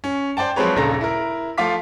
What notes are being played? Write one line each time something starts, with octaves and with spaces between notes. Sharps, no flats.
C#4
C5 D5 G5 A5
F3 F#3 G#3 C4 B4 C#5
D#1 A#1 C#3 A4 A#5 A#6
E4 A#4
F3 A3 F4 F5 D6 B6